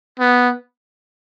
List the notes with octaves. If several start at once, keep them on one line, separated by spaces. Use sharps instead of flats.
B3